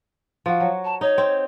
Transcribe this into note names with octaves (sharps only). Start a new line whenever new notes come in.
F3 F#4
F#3
A5
D#4 C#5
C4